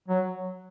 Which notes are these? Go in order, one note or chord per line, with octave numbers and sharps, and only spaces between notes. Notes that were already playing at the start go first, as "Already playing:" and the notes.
F#3